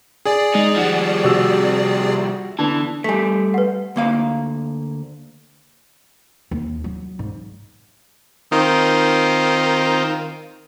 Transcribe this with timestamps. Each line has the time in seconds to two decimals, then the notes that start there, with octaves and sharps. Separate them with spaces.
0.26 G#4 D5 G#5
0.55 G#3 D#4
0.76 F3 G3 F#5
1.24 C3 F#4 E6
2.59 D3 E3 B3 A5
3.04 G3 A3 G#5 B6
3.54 B4 F#5
3.96 D2 A#3 F5
6.51 D#2
6.84 F#3
7.19 G#2
8.52 D#3 C4 D#4 F4